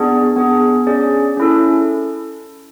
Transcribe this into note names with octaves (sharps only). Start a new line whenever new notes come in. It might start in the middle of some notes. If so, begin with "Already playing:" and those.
Already playing: B3 D4 G#4 D5
B3 D4 G#4
C#4 G#4 D5
C#4 E4 A4